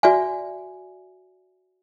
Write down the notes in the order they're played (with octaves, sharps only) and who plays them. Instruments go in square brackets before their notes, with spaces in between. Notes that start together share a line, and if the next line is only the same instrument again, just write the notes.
[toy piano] F#4 D5 E5 G#5